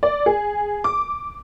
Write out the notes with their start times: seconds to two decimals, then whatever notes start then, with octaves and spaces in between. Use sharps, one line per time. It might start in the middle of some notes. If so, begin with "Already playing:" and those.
0.03 D5
0.26 G#4
0.84 D6